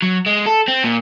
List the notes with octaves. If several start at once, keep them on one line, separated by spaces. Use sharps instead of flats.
F#3
G#3
A4
C4
A#2